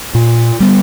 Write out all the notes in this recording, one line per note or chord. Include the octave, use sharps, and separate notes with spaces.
A#2
G3 B3